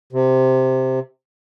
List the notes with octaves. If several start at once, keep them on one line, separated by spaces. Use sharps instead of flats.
C3